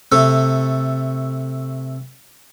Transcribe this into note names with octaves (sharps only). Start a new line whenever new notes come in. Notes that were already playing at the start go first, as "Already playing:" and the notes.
C3 A3 A4